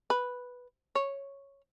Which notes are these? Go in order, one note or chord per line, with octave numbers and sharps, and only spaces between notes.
B4
C#5